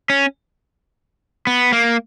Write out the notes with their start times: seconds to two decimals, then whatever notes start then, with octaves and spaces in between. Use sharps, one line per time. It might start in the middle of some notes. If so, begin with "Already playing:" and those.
0.10 C#4
1.47 B3
1.73 A#3